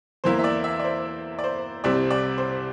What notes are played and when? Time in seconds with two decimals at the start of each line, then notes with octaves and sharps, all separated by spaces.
0.24 E2 E3 A#3 E4 C5
0.39 E5
0.44 D5
0.64 E5
0.80 D5
0.84 C5
1.39 D5
1.44 C5
1.84 C2 C3 G3 C4 E4 D5
2.11 D5
2.38 C5